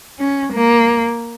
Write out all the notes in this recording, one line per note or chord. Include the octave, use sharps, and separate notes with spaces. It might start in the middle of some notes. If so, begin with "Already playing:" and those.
C#4
A#3